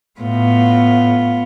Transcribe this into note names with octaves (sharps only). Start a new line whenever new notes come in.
A2 B3 F4